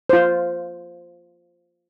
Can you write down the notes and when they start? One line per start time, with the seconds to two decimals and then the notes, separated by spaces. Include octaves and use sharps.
0.10 F4 C5